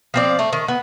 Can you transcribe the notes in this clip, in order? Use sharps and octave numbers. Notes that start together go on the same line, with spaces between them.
F3 C4 D5
A3
D#3
B3